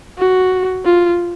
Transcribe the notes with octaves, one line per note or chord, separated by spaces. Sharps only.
F#4
F4